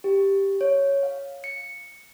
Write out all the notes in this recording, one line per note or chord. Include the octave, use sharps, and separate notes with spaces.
G4
C#5
F5
C#7